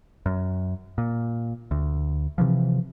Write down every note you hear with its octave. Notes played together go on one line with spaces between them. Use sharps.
F#2
A#2
D2
C3 E3 F3